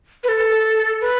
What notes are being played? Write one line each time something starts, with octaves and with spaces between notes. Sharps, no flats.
B4
A4
B4